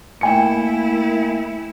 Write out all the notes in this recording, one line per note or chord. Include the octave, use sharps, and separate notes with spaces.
A3 A#3 E4 G5 G#5 C#7